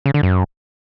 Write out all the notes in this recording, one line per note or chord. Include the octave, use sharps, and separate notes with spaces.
C#3
D3
F#2